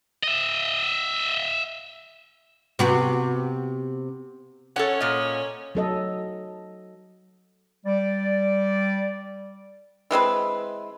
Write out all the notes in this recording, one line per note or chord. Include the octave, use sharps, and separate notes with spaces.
D#5 E5
C3 B3 F#4
C#4 A4 C#5 F#5
A#2 D#5
F#3 A4 D#5
G3 D5
E3 G#3 C4 B4